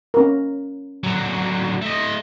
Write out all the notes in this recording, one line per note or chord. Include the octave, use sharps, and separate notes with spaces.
C#4 A#4
D3 F#3
A3 D#5